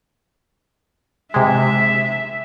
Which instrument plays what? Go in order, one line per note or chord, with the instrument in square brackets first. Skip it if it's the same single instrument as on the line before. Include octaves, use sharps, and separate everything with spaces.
[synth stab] C3 G#3 [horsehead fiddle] E5